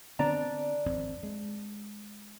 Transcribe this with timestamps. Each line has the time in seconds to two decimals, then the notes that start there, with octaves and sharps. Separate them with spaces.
0.19 D3 B3 C4 D4 D5 A#5
0.86 G#1 F2 C4
1.23 G#3